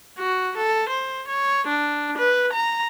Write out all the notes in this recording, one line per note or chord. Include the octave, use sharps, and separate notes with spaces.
F#4
A4
C5
C#5
D4
B4
A#5